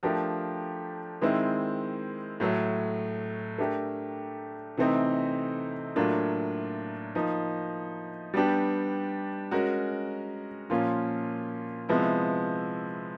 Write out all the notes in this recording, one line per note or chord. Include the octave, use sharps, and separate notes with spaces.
F3 A3 D4 G4 A#4
D#3 G#3 C4 E4
A2 F#3 A3
A3 D4 G4 A#4
C3 E3 A3 C4 D#4
A2 F#3 A#3 D4 F4
F3 A#3 D#4
G3 B3 D4 G4
G#3 C#4 F#4 A#4
A#2 F3 A#3 C#4 F4
C3 F3 G#3 B3 E4